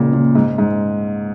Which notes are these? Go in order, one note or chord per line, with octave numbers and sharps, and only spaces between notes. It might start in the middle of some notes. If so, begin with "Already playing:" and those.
Already playing: C#2 A#2 C#3
A#2
G#2
G#2